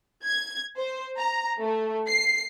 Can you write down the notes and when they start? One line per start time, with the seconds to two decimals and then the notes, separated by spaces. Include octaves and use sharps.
0.24 G#6
0.78 C5
1.18 A#5
1.60 A3
2.08 C7